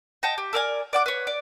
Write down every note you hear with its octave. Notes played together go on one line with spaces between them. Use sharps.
D#5 F#5 G5 A5
G4
A4 A#4 D5 G#5
D5 F#5 D6
B4 C#5
D5